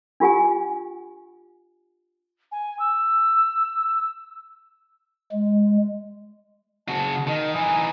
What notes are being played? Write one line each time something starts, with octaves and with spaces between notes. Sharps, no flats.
D4 F4 G4 F#5 G#5
G#5
E6
G#3
C#3 F#4 A5
D#3 D#5
E3 D#4 G#5